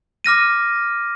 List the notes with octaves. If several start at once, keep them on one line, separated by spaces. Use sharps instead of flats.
D6 F6 A#6 D#7